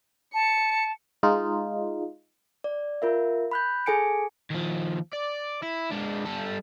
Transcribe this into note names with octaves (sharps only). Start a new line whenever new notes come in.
A5 C#7
G#3 D#4 F4
D5
F4 A#4 E5
B5 F#6 G6
G#4 A4 G#5 C#7 D7
D#2 F3
D5
E4
G#3 D4
G3 A4